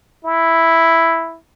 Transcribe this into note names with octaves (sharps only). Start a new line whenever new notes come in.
E4